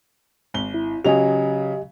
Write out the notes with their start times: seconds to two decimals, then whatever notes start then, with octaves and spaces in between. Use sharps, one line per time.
0.54 G#1 G7
0.74 E4
1.05 C#3 F#3 G4 D#5 G#5 F7